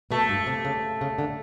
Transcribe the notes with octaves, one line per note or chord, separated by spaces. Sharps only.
B2 A3
F#2
G2
C3
C#3
C#3
D3